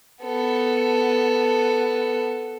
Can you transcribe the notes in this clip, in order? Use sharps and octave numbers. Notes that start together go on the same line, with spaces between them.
B3 A4